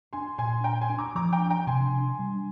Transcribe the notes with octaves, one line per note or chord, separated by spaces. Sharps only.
D4 G#5 C6
A#2 G#5 C6
D4 G5 A#5
G#5 C6
D4
A#5 D6
F3 A#5 D6
G5 A#5
D4
G5 A#5
C3 G#5 C6
D4
G3